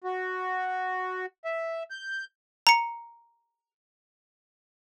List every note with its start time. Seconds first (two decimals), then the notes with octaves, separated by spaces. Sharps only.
0.04 F#4
1.45 E5
1.91 G6
2.67 A#5 C#7